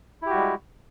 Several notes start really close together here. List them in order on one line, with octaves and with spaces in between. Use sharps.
E4 G4 F#4 G3 G#3